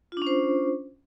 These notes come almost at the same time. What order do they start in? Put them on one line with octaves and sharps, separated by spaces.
F4 D4 C#4 C5